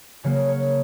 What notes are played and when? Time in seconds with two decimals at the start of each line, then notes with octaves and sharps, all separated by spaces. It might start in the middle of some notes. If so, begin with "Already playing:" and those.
0.24 C#3 F#3 A#3 C#5
0.36 A#4
0.48 C#5